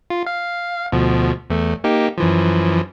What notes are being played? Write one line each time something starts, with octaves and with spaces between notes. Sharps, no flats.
F4
F5
D2 B2 F3
E2 A3
A#3 D#4 G4
F#2 E3 F3